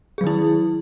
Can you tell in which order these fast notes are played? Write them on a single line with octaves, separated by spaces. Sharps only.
G#4 F#3 D#3 E4